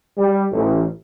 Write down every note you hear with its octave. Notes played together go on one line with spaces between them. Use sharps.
G3
A1